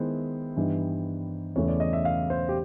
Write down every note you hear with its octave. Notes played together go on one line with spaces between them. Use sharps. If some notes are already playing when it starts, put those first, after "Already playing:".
Already playing: D#3 G#3 B3 E4 C5
G2 E3 G3 B3 D#4
E2 C#3 E3 A3 C#5
D5
D#5
E5
F5
C5
G4